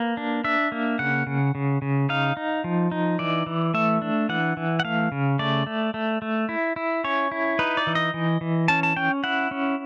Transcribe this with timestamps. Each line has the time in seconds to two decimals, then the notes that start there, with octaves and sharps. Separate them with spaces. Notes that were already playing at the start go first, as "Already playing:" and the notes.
Already playing: A#3 B4
0.17 D4
0.44 D4 E5
0.72 A#3
0.99 C#3 F#5
1.27 C#3
1.55 C#3
1.82 C#3
2.09 D#4 F5
2.37 D#4
2.64 F3
2.92 D#4
3.19 E3 D5
3.46 E3
3.74 A3 E5
4.02 D4
4.29 E3 F#5
4.57 E3
4.80 F#5
4.84 A3 F5
5.12 C#3
5.39 A3 D5
5.67 A3
5.94 A3
6.22 A3
6.49 E4
6.76 E4
7.04 C#4 C#5
7.32 E4
7.59 D#4 B4
7.77 D5
7.87 E3
7.95 D#5
8.14 E3
8.41 E3
8.68 C#4 A5
8.83 A5
8.96 C#4 G5
9.24 E4 F#5
9.51 C#4